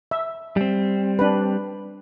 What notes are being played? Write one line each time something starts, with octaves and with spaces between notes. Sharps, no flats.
E5
G3 C4
D4 B4